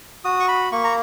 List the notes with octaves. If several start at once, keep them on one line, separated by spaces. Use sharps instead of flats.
F#4 D#6
C#6
B5
A#3 C#6
A#5